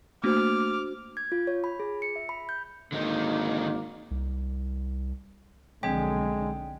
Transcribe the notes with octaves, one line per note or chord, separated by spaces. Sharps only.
A3 A#3 D4 F#4 C5 D6 F6
G#6
F4
C#5
B5
G#4
C#7
E5
B5
G6
G#1 D3 A#3 D#4
C2
B1 D3 F3 G#3 C4 G5